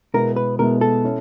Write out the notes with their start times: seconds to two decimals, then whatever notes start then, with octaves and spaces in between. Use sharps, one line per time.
0.14 B2 G#3 B3 E4 A#4
0.36 B4
0.59 B2 G#3 B3 E4 A#4
0.81 A4
1.04 C#4 E4